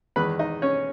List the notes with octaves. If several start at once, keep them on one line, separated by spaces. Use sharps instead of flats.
E2 D#3 G#3 B4 B5
D#4 D#5
C#4 C#5